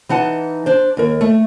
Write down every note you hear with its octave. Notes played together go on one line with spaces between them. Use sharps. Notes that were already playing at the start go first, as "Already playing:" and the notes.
E3 D#4 F#5 A5
D4 C5
D#2 A#4
A3